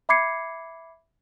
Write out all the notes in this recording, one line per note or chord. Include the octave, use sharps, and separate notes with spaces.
E5 B5 D6 G#6 C7 C#7